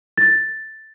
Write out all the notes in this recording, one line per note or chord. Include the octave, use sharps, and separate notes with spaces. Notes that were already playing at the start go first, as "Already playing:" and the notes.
A6